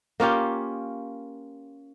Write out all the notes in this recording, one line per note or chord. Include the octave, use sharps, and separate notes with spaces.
A#3 C#4 F4 G4